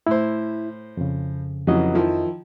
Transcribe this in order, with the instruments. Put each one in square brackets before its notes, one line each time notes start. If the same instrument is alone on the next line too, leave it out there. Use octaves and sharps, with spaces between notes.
[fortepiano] A2 C5 [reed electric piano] E4
[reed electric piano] F2 C#3
[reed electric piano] F2 D#5 [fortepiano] C#3 E3 F#3
[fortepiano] D#3 F3 E4